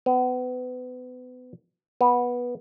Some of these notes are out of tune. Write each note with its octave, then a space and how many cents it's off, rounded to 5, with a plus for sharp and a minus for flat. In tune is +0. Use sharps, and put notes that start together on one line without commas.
B3 +30
B3 -15